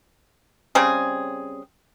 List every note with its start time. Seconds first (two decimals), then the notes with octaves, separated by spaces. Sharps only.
0.75 C#3 G3 C4 G#4